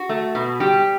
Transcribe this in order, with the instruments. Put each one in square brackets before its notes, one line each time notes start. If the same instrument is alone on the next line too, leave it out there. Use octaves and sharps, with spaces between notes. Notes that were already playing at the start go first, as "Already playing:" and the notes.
Already playing: [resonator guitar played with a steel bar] F#4
A3
B2
G3 G4